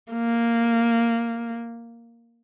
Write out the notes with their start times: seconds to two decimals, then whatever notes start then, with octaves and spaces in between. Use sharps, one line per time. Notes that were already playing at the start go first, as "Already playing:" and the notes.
0.13 A#3